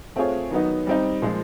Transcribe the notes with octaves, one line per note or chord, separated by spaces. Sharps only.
A3 C4 F4 G#4 C#5
D#3 F#3 B3 D#4
G3 C4 D#4
A#2 F3 G#3